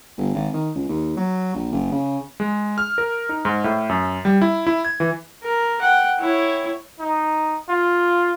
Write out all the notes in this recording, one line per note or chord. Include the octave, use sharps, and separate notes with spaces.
G1
G#1
D#3
C#2
D#2
F#3
A#1
F#1
C#3
G#3
F6
A#4
D#4
G#2
A2
F#2
G3
E4
E4
G#6
E3
A#4
F#5 G5
E4 C#5
D#4
F4